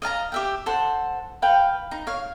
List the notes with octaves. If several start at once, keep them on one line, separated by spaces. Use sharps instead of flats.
D#5 F5 A5 A#5
G4 E5 G5
A4 C5 F#5
B4 F5 G5
D#4
C#5 F5